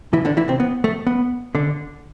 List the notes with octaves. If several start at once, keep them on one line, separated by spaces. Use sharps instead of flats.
E3 E4
D3 D4
E3 E4
C3 C4
B3
A3
B3
D3 D4